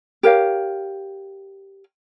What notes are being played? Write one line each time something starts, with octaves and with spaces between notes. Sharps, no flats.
G4 A#4 C#5 F5